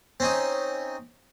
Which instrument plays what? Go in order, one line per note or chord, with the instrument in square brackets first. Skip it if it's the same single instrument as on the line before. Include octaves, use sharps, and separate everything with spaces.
[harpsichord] C4 C#4 D#4